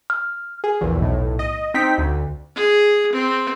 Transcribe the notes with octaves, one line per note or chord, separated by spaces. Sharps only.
F6
G#4
A#1 E2
B1 A2
D#5
C4 D#4 G5 B6
D2
G#4
C4